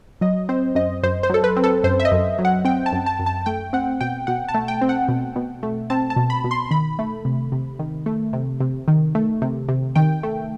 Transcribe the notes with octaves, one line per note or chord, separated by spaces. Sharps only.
F#3 D#5
C4 C5
F#2 D#5
F#2 C5
C5
F#3 A4
B4
C4
A4
F#2 C5
E5
D#5
F#2
F#3
F#5
C4 G5
A5
F#2
A5
F#2
A5
A3 G5
C4 F#5
B2 G5
B2 F#5
A5
A3
G5
C4
F#5
B2
B2
A3
C4 A5
A5
B2
B5
B2
C6
D#3 B5
A3
C3
C3
D#3
A3
C3
C3
D#3
A3
C3
C3
D#3 G5
A3